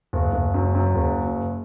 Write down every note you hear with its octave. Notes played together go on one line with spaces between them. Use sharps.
F#1
F#1
F#2
F#2
F#1